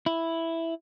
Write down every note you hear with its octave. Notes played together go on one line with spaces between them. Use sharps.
E4